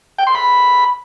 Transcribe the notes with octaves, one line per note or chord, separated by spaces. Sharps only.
G5
C6
B5